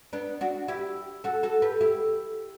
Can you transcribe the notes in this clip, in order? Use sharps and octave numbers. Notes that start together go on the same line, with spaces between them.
B3 D4
D4 F#4
E4 G4
F#4 A4
F#4 A4
G4 B4
E4 G4